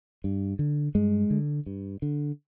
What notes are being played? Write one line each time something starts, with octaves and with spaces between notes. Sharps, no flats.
G2
D3
G2 G#3
D3
G2
D3